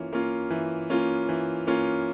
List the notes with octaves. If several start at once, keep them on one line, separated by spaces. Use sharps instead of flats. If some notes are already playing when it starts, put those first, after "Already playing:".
Already playing: E3 A#3 C#4 F4
A#3 C#4 F4
E3
A#3 C#4 F4
E3
A#3 C#4 F4